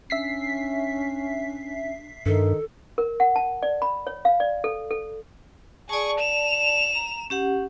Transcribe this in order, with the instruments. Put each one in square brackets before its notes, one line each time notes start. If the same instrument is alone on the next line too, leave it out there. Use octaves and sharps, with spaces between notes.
[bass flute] C#4 [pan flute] D4 [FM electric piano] E5 B6 C7
[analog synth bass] G2 [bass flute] D#3 [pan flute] A4
[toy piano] A#4
F#5
A5
D5
B5
C#5
F5
D5
A4
A4
[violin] G#4 C#6 [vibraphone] D5 A5
[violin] E7 F7
[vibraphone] A#5
C#4 G4 F#5